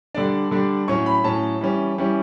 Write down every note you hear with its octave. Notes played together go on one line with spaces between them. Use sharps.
D3 G3 D4 D5
D3 G3 D4
A2 F#3 C#4 C#6
B5
A2 F#3 C#4 A5
E3 G3 C#4
E3 G3 C#4